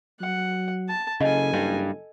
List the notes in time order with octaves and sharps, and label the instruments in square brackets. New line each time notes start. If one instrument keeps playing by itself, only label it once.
[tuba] F#3 [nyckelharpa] F#5
[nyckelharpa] A5
[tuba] F#1 [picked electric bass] C#3 [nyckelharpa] A4 G#5 [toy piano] D#5
[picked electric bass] G2